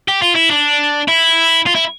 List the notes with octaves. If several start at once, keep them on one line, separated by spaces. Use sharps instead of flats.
G4
F4
E4
D4
E4
F4
E4